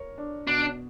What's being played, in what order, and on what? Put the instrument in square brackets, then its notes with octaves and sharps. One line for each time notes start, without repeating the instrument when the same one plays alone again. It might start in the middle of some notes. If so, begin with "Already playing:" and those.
Already playing: [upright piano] A#4 C#5
D4
[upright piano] B2 [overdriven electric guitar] D4